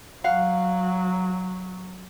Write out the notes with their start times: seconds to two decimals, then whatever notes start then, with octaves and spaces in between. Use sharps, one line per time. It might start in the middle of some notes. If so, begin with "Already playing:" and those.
0.24 F#3 F5 F#5